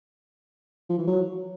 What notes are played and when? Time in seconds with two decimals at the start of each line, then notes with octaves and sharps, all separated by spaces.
0.89 F3
0.98 E3
1.07 F#3